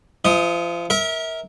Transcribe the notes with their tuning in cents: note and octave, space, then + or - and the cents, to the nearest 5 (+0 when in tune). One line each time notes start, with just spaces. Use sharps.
F3 -30 D#5 +35 D#6 +0
A#4 +0 E5 -30